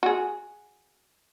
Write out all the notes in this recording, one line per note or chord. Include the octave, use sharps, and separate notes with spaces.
F#4 G#4